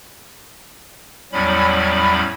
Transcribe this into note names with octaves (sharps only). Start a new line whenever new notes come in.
E2 A2 F#3 G3 C#4 B5